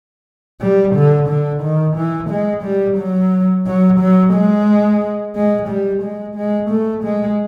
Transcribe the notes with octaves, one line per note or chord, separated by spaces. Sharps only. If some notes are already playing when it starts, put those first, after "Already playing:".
G3
D3
D3
D#3
E3
G#3
G3
F#3
F#3
F#3
G#3
G#3
G3
G#3
G#3
A3
G#3